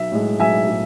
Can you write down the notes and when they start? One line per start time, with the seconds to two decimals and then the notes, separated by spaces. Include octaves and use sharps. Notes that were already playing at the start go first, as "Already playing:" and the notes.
Already playing: B1 E5
0.12 A2 G#3
0.40 B1 E5 G#5
0.68 A2 G#3